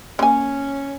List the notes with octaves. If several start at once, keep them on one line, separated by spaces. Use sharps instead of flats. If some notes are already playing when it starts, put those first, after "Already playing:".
A#3 C#4 G#5